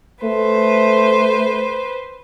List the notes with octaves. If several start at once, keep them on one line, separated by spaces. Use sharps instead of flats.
A3 B4 C5